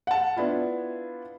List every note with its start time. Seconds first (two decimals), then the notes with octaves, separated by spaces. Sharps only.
0.07 F#5 A5
0.37 B3 D4 E4 F4